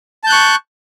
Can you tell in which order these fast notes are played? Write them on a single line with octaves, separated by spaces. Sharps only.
A5 G6 F#6 C#6